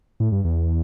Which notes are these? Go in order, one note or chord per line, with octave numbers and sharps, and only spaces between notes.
A2
G2
E2